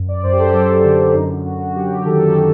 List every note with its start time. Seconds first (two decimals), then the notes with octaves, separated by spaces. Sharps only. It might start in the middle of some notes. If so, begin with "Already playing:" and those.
Already playing: F#2
0.09 D5
0.23 F#2 C5
0.32 G4
0.39 A4
0.53 F#3
0.84 D3
1.14 F#2 D#4
1.45 F#2 F#4
1.75 F#3 G4
2.05 D#3 A4